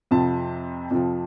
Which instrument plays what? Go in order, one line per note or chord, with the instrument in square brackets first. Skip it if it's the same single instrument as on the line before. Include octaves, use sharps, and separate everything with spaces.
[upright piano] F2 C3 F3 A5
F2 C3 F3